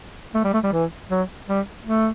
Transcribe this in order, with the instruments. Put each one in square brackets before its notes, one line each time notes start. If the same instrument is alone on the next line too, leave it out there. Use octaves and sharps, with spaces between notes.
[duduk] A3
G3
A3
G3
E3
F#3
G3
A3